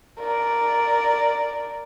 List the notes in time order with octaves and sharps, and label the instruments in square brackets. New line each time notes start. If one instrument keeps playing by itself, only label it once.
[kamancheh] A#4 D5